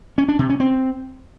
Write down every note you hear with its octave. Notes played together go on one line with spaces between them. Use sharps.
C#4
D4
C3
C#4
C4